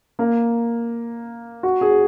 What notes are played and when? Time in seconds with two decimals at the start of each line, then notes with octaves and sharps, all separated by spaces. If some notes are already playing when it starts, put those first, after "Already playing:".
0.19 A#3
1.63 F#4
1.81 G#4